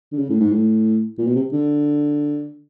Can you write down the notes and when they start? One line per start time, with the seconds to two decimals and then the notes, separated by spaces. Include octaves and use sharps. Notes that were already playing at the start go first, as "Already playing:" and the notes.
0.12 D3
0.18 C#3
0.29 A2
0.40 G#2
0.51 A2
1.18 A#2
1.27 B2
1.35 C3
1.53 D3